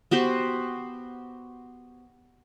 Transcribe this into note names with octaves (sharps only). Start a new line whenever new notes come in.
B3 F#4 G4 C5